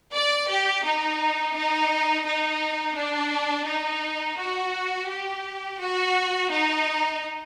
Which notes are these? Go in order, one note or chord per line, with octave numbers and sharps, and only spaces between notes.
D5
G4
D#4
D#4
D#4
D4
D#4
F#4
G4
F#4
D#4